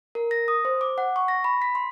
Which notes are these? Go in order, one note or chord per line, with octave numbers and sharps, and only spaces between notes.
A#4
A#6
D#6
C5
D6
F#5
C#6
A#6
B5
B6
C6